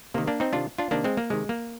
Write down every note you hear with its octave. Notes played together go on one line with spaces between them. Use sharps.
C3 D#3 A#3
A#3 D4
C4 D#4
C3 D#3 D4 F4
D4 F4
C3 D#3 A#3 D4
G#3 C4
A#3
C3 D#3 G#3
A#3